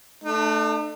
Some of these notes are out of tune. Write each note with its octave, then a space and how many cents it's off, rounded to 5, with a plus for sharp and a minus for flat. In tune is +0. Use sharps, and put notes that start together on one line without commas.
A3 +0 D4 +45